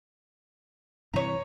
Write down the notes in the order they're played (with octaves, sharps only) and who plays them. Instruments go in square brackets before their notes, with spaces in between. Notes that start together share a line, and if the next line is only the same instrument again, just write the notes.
[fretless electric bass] G2 C3 E3 [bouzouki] C#5 A#5